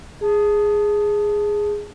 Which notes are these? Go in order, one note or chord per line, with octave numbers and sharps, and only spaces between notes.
G#4 A5